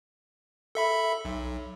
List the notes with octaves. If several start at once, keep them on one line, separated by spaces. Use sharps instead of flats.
A4 E5 B5
B1